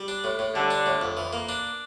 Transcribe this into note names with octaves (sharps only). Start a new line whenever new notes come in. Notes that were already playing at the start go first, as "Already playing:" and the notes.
Already playing: G3
D4
A2
A2
D3 G3
D4
A2
F2
E3
A#3
D4